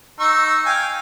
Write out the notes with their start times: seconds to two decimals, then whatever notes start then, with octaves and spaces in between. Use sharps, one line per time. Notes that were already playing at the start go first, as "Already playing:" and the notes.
0.20 D#4 C#6 E6
0.66 F5 G5 G#5